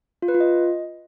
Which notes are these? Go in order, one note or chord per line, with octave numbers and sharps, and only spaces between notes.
F4
B4
F4
D#5